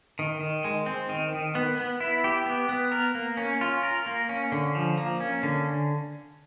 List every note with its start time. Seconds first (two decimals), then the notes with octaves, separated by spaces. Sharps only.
0.19 D#3
0.41 D#3
0.64 G#3
0.86 C4
1.09 D#3
1.33 D#3
1.55 B3
1.78 B3
2.00 E4
2.24 G4
2.46 B3
2.69 B3
2.92 A#4
3.15 A#3
3.37 C#4
3.61 F4
3.83 A#4
4.06 A#3
4.29 C#4
4.52 D3
4.75 F3
4.97 A#3
5.20 C#4
5.43 D3